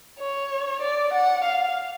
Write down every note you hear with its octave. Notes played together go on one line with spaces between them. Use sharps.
C#5
D5
F#5
F5